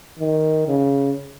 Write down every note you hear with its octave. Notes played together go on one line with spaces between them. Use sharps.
D#3
C#3